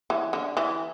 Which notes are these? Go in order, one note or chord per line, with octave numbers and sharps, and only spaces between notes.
E3
D3
E3